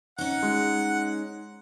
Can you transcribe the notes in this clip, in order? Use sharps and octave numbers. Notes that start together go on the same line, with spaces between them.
C#4 D#4 F#5
G#3